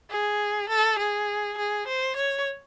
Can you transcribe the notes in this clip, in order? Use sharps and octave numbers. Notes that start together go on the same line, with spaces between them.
G#4
A4
G#4
G#4
C5
C#5